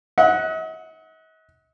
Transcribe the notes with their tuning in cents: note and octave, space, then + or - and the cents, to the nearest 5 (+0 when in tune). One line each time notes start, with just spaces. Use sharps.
D#5 +45 F#5 +0